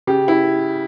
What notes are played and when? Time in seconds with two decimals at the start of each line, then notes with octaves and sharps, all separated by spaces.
0.07 C#3 G4
0.28 E4